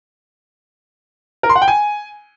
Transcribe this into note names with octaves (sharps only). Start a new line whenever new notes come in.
A#4
C6
F#5
G5
G#5